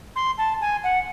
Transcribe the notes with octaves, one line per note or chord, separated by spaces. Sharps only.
C6
A5
G#5
F#5